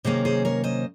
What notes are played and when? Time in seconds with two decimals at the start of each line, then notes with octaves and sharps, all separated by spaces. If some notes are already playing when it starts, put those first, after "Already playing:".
0.05 C3 D#3 F#3 A#3 C#4 G#4 C5
0.25 G#4 C5
0.45 A#4 C#5
0.64 C5 D#5